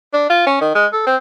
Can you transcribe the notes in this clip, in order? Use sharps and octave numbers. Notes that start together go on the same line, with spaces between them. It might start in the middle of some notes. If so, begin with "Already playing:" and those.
D4
F4
C#4
D#3
G#3
A4
C4